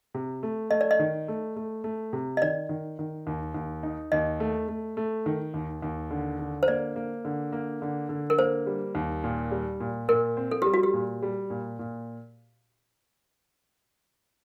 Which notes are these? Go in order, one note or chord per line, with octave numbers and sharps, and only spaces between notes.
C3
A3
A3 D#5
D5
D#5
D#3
A3
A3
A3
C3
D#5
D#3 D5
D#3
D#3
D#2
D#2
D#4
D#2 D#5
A3
A3
A3
D#3
D#2
D#2
D3
D3
C5
A#3 D5
A#3
D3
A#3
D3
D3
A#4
A#3 C5
G3
D#2
A#2
G3
A#2
A#2 A#4
C4
A4
G3 G4
F#4
G4
A#2
G3
A#2
A#2